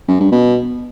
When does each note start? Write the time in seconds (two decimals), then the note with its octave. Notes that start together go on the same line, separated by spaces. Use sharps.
0.08 F#2
0.20 G2
0.31 B2